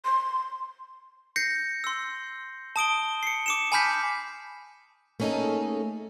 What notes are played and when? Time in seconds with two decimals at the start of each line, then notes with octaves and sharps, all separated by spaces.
0.05 C6
1.36 G6 A#6 C7 C#7
1.84 C6 E6
2.76 A5 D#6 D7 G7
3.23 C7 C#7
3.46 D6 C#7 E7
3.72 G#5 A5 B5 F6 G6 B6
5.20 A3 A#3 C#4 D#4 G#4 A4